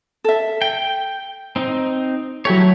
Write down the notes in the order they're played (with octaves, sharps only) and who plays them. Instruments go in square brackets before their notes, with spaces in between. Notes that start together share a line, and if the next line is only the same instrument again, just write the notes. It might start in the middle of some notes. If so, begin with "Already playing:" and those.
[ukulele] A4 E5
[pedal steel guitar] G5
C4 D#4
[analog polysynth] F#3 A3 [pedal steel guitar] E4 G4 C#5